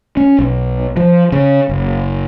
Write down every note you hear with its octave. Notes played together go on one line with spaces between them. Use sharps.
C#4
B1
F3
C#3
F#1